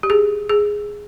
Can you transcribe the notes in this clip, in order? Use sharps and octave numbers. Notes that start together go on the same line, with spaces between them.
G4
G#4
G#4